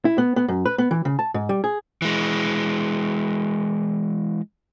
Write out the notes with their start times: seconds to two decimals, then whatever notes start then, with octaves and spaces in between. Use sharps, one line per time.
0.05 E4
0.18 B3
0.36 B3
0.48 F#2
0.66 B4
0.78 B3
0.91 E3
1.05 C#3
1.19 A5
1.34 G#2
1.49 G3
1.64 G#4
2.02 E3 G#3